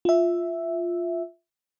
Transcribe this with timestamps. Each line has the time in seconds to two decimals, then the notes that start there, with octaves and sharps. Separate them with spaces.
0.05 F4 E5